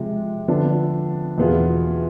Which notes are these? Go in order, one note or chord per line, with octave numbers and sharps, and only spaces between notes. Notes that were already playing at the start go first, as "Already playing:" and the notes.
Already playing: C3 F3 G#3
D3 F3 B3 D4 A4
E2 B2 B3 F4 G#4